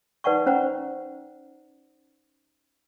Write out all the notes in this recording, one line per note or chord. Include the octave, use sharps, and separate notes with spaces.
D#4 B4 D5 F#5 A5 C#6
C#4 C5 F#5 A#5